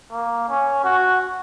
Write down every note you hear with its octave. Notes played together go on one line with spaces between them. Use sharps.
A#3
C#4
F#4